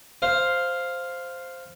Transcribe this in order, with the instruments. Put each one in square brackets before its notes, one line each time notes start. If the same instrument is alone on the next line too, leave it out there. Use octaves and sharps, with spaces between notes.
[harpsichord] C5 F5